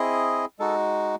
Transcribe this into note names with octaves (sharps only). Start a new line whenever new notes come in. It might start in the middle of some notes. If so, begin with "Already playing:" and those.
Already playing: C4 E4 G#4 D#5
G#3 D#4 F#4 A4